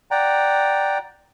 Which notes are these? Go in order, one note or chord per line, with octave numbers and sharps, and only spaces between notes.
D5 F#5 G5 A#5